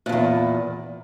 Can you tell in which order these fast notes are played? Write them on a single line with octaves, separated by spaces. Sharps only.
A#2 G2 E2